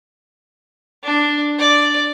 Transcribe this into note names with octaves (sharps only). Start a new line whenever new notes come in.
D4
D5